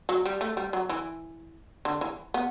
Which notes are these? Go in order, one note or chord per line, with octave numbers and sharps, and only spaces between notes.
F#3
G3
A3
G3
F#3
E3
D3
E3
B3